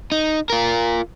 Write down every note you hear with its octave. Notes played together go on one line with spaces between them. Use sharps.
D#4
F4 A#4